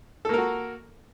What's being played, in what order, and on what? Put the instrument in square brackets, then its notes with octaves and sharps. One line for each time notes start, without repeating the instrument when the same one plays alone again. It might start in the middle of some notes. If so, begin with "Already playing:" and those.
[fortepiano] A4
A#3
A#4
F#4